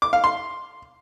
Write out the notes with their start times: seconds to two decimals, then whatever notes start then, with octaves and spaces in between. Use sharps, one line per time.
0.02 D6
0.13 F5
0.24 C6